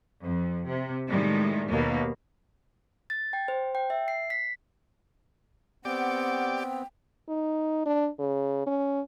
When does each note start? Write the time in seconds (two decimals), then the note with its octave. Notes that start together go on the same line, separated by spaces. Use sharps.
0.23 F2
0.67 C3
1.08 A2 D#3 G3 G#3
1.68 D#2 B2 A#3
3.10 A6
3.33 G5
3.48 C5
3.75 G5
3.90 E5
4.08 C7
4.30 B6
5.85 B3 C4 G4 D5 F#5
6.58 G5
7.28 D#4
7.86 D4
8.19 C#3
8.66 C#4